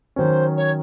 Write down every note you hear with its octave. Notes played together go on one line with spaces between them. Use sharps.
D#3 F#3 C#4 C5
C#5